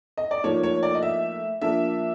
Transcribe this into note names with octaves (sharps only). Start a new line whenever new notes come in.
D#5
D5
A2 F3 A#3 D#4 C#5
C#5
D5
D#5
E5
F3 A#3 D4 E5